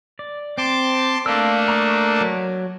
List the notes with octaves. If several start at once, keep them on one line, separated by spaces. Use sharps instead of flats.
D5
C4 A5 C6 D6
A3 A#3 D4 F5 E6
A#5 C#6 D#6
F#3